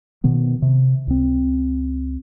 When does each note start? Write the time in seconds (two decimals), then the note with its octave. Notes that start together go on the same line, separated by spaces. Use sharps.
0.24 B2 D#3 B3
0.62 C3
1.07 C#2 C4